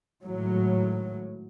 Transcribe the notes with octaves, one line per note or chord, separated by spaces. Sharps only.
G#1 A2 F#3